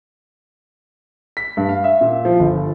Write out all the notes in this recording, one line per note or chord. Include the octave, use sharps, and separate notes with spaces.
B6
G2
F5
E5
A#2
F3
G1